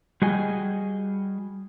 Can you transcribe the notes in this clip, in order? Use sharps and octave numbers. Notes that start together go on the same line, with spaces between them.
G3 F#4 G#4 D#5 G5 G#5